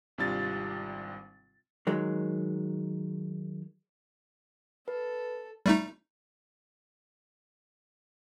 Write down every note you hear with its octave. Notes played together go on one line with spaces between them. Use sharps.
G#1 C3 G3 D4 F4 A6
D#3 F#3 G#3
A4 B4
G3 A3 D#4